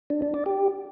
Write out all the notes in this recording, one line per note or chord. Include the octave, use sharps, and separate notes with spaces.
D4
D4
D5
G4